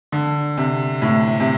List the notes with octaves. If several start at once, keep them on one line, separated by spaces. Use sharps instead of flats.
D3
C3
A2
C3